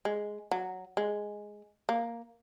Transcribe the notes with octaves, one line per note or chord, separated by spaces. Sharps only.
G#3
F#3
G#3
A#3